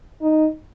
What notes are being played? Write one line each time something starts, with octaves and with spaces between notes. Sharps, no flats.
D#4